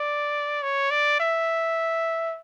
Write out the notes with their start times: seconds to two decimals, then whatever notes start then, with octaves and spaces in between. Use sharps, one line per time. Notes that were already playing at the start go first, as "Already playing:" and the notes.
Already playing: D5
0.63 C#5
0.91 D5
1.20 E5